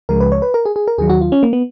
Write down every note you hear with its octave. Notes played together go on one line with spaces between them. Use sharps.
C#2 C#3 F3 G#3 A#4
B4
C#5
B4
A#4
G#4
G#4
A#4
D#2 D#3 F#3 G#4
F#4
F4
C#4
A#3
B3